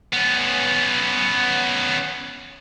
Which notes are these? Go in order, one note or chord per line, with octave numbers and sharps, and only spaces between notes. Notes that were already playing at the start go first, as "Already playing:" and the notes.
B3 C#4